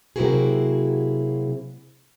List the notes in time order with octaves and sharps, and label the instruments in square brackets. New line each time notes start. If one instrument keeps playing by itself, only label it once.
[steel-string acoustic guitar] C3 F#3 A#3 E4 F#4 G#4